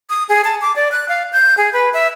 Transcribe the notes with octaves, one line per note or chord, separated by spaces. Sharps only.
D#6
G#4
A5
D6
D5
F#6
F5
G6
G#4
B4
E5